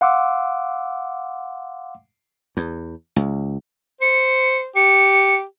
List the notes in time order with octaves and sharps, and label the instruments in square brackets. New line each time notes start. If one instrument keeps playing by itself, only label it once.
[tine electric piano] F5 F#5 C6 D6 E6
[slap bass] E2
C#2
[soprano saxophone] C5 [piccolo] C#7
[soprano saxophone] G4 [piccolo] C#7